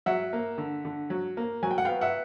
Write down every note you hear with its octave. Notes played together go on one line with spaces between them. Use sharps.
F#3 E5 F#5
A#3
D3
D3
F#3
A#3
F#3 G#5
G5
F#5
B3 F5 G5
E5 F#5